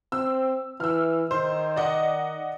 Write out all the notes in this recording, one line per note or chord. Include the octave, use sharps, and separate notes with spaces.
C4 E6
E3 E6 F6
D#3 C5
D5 D#5 F#5